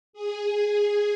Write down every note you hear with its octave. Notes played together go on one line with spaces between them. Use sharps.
G#4